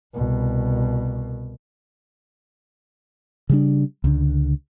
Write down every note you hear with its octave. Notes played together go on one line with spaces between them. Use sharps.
C2 B2
C#3 G3 D4
C#2 D3